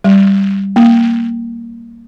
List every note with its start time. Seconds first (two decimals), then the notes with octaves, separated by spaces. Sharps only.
0.04 G3
0.76 A#3